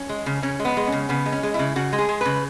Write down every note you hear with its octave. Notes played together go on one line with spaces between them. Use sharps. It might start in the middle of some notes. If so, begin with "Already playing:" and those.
Already playing: C#4
G#3
C#3
C#3 C#4
G#3
B3
G#3
C#4
C#3
C#3 B3
G#3
C#4
G#3
C#3 E4
C#3 F#4
G#3
G#4
G#3
C#3 B4